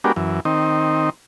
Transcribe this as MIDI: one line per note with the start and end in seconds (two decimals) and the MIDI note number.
0.04 0.12 56
0.04 0.12 59
0.04 0.12 62
0.04 0.12 66
0.04 0.12 67
0.04 0.12 70
0.16 0.40 42
0.16 0.40 52
0.45 1.10 51
0.45 1.10 60
0.45 1.10 63